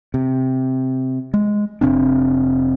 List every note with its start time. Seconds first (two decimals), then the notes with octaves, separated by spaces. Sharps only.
0.14 C3
1.34 G#3
1.81 F1 C3 C4 D4